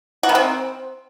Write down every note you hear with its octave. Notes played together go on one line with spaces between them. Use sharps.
F#4
D#3
C4